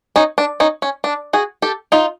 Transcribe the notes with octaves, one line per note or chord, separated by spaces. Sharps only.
C#4 D#4
D4
C#4 D#4
C#4
D4
F#4 G#4
G4 A4
D#4 F4